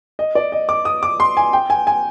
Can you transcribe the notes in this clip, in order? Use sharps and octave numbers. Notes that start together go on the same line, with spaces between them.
D#5
D5
D#5
D6
D#6
D6
C6
G#5
G5
G#5
G#5